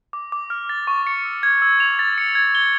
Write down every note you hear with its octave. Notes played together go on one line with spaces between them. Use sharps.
D6
D6
F6
A6
C#6
C#7
E6
G#6
E6
F7
A6
C#7
G#6
G7